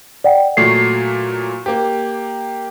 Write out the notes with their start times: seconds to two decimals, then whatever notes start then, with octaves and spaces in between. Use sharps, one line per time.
0.24 D5 F#5 G5
0.57 A#2 F#3 A3 C7
1.66 A#3 G4